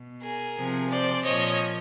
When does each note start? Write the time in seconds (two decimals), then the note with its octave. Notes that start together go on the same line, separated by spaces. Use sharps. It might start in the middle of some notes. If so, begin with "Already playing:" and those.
Already playing: B2
0.22 G#4 A#4
0.57 C3 F3
0.90 C5 D5
1.24 A#2 F3 C#5 D#5